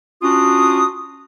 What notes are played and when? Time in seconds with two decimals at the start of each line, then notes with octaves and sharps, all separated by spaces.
0.22 C#4 D4 F4 F#4 D#6